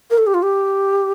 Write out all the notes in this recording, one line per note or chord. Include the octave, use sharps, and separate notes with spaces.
A#4
A4
G4
F4
G4